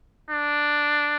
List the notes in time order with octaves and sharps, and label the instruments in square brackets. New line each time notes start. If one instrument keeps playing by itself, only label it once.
[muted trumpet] D4